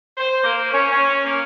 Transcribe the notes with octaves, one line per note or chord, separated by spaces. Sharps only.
C5
A#3
C#4
C#4
A#3